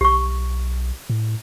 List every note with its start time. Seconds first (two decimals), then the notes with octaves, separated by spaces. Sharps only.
0.01 B1 G4 C#6
1.10 A2